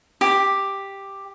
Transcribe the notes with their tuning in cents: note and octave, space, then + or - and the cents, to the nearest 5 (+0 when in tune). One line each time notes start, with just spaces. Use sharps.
G4 +5